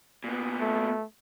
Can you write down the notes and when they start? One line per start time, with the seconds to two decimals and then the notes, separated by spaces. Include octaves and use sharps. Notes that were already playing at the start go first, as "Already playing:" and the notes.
0.24 A#2 B3
0.61 A3